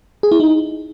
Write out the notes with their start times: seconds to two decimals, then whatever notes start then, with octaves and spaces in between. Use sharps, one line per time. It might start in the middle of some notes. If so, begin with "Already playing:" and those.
0.23 G#4
0.32 E4
0.40 D#4